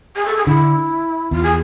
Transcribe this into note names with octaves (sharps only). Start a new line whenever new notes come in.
G#4
A4
G#4
D3 E4
E2 F4
G#4